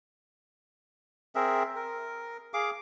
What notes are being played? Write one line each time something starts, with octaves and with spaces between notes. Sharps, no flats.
C4 G#4 A#4 E5
A#4
G#4 F5 D6